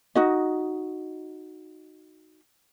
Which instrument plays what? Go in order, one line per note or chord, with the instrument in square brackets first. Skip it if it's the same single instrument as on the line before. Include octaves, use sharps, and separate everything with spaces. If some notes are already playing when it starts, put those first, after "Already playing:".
[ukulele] D#4 F#4 D#5